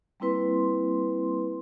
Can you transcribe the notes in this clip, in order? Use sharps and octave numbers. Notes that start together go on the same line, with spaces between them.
G3 A#3 C4 E4 B4 C6